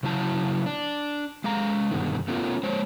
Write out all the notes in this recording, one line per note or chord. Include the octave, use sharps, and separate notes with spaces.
C#3 F#3 E4 A5
D4
G#3 F5 A#5
G2 B2 D3 D#3
A3 B3 C#4 F4 G4 A#4
G#3 C5 C#5